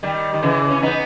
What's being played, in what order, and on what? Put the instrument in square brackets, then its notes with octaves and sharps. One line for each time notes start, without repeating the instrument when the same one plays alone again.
[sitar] D#3 G3
D#3
C#3 E3
C#4
B3 D#4